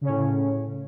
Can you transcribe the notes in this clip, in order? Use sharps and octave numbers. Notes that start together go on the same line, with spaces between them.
A2 C#3 C#4